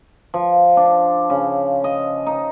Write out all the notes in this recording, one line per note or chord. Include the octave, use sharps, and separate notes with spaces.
F3
D4
C#3
D#5
D#4